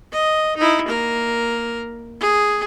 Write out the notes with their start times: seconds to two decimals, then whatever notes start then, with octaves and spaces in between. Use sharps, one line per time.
0.12 D#5
0.57 D#4 E4
0.87 A#3 A#4
2.20 G#4